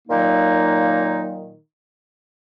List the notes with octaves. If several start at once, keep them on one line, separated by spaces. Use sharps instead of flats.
A#2 D#3 F#3 A#3 D#4